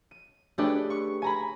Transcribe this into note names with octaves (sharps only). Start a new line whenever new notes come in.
D#7
A3 D4 G4 G#4 B4
C#6
G#5 A#5 B5